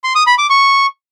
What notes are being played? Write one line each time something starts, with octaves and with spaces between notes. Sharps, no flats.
C6
D#6
B5
D6
C#6